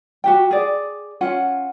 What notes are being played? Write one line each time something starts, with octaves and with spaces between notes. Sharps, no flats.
F#4 G4 G5
G#4 D5
C#4 F4 F#5